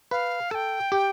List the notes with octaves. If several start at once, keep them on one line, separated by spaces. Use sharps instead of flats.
B4 F5
A4 G5 A5
G4